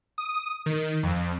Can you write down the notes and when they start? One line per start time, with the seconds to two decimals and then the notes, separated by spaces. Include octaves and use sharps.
0.18 D#6
0.66 D#3
1.03 F2